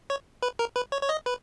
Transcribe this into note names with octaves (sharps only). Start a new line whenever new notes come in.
C#5
B4
A#4
B4
C#5
C#5
D#5
B4